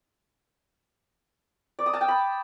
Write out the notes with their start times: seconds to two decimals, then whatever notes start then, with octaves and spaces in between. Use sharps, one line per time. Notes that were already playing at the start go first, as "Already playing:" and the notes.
1.79 D5
1.86 D#6
1.93 A5
2.01 G5
2.08 B5